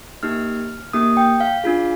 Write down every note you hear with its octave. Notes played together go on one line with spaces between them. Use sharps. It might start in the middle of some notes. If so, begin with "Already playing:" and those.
A#3 D#4 G4 F6
A#3 D#4 G4 D#6
G5
F5
D4 F4 G#4